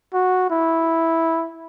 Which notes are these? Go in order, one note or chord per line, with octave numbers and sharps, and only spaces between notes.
F#4
E4